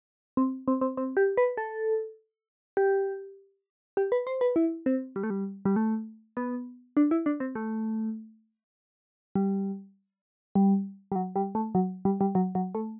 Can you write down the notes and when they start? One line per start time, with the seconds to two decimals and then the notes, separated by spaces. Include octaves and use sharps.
0.37 C4
0.68 C4
0.81 C4
0.97 C4
1.17 G4
1.37 B4
1.57 A4
2.77 G4
3.97 G4
4.12 B4
4.27 C5
4.41 B4
4.56 E4
4.86 C4
5.16 G3
5.23 A3
5.30 G3
5.65 G3
5.76 A3
6.37 B3
6.97 D4
7.11 E4
7.26 D4
7.40 C4
7.55 A3
9.36 G3
10.55 G3
11.12 G3
11.16 F#3
11.36 G3
11.55 A3
11.75 F#3
12.05 G3
12.21 G3
12.35 F#3
12.55 F#3
12.75 A3